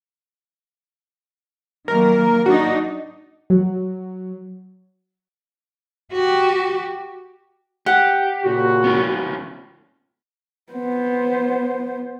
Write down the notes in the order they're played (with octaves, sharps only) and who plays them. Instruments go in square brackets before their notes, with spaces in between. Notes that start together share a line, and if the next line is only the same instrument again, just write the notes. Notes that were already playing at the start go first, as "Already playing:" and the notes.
[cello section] D#3 F#3 A#3 [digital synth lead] A#4
[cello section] D4 D#4 [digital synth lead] F#4
[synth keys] F#3
[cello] F#4 G4
[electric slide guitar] G4 [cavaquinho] F#5
[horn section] A#2 C#3 F#4
[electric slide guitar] B3 C#4 F4
[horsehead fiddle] B3 C5